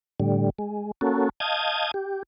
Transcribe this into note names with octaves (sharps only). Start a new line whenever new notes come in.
A2 D3 G3
G#3
A#3 C#4 F#4 A4
D#5 F5 A5 D#6 G6 G#6
G4